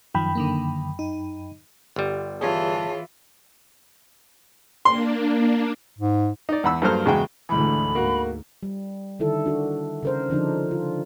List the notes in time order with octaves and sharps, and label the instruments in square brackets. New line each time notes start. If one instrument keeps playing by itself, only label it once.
[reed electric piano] F#2 G5 B5 [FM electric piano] D#3 F3
[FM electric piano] D3 D#3 A#3
D#4
[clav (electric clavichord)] G1 G3
[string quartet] E3 F4 [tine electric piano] G#4 C#5 [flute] A5
[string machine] A#3 D4 [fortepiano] C6
[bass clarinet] G#2
[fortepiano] D#4 D5
E2 F#5 B5 E6
G2 F#3 A#3 A4 C5 F6
E2 C#3 G#3 F#4 G5
[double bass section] D2 D3 [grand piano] G#2 E3 [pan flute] B5
[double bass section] G#2 [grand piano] A#3 F#4
[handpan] G3
D3 D#3 E4 A4
D4 F#4
C#3 A#4 C5
D3 F3 D4 D#4
F4